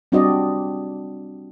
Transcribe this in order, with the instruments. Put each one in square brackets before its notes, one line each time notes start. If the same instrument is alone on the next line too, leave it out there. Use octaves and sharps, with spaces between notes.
[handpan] G3 C4 D4 F#4 D5 D#5